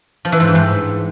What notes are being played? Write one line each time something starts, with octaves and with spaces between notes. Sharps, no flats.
F3
E3
G#2
G2
G#2